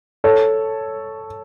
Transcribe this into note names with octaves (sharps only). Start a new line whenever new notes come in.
A4 C#5